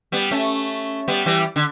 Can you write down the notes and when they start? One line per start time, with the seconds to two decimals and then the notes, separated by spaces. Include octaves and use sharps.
0.12 G3 B3
0.31 A3 C#4
1.08 G3 B3
1.26 E3 G3
1.56 D3